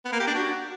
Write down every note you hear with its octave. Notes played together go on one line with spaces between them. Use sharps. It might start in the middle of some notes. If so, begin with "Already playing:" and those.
B3
A#3
G4
D4
F#4